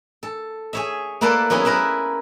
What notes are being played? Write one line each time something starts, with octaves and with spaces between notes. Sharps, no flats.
A4
G#4 C#5 E5
A#3 E4 A4 B4 D5 A5
F#3 B3 C#4 E4 G#4
E4 A#4 B4 E5